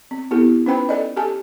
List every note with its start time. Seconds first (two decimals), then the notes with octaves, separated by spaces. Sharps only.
0.11 C4
0.31 B3 E4 G4 A4
0.66 C#4 D#4 B4 C5 G5 B5
0.89 A4 D5 D#5
1.17 G4 A4 G#5 A5